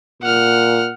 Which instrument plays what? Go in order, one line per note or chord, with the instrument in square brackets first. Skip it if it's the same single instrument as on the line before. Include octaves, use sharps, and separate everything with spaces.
[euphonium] A#2 [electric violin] F#5 F6